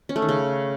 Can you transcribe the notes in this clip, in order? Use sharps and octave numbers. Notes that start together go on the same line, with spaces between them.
C#4
A3
D#3
C#3